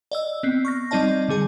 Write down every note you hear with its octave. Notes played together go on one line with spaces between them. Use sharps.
D5 D#5 E6
B3 C4
C#6 F6 A#6
G3 C4 D#4 D5 D#5 A5
D3 G3 G#4 G#5